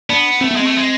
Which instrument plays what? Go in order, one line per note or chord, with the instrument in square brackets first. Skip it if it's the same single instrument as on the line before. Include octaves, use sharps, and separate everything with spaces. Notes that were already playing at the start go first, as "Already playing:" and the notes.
[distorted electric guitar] B3 [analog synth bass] D4
[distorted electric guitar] A3 [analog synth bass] C4
[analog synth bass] B3
[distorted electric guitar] G#3 [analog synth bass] C4
[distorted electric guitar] A3
G#3